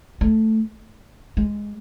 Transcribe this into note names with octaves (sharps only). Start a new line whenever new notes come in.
A3
G#3